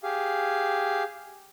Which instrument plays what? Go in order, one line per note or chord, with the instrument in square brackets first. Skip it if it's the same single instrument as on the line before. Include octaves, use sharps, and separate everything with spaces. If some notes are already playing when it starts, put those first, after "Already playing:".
[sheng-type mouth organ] G4 G#4 F5